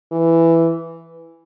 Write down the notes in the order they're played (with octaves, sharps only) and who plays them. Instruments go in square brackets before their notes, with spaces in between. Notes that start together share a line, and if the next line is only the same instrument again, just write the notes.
[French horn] E3